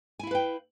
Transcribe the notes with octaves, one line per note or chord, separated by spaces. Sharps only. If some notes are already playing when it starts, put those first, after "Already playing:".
E4 B4 F5 G5 G#5